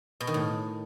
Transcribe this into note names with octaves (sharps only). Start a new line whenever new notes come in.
B2
D#3
A2